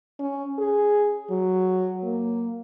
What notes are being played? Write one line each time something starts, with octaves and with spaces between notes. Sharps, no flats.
C#4
G#4
F#3
A#3